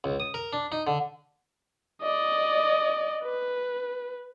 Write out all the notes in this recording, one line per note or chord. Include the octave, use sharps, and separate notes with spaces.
C#2
D#6
A#4
D4
D#4
D3
D5 D#5
B4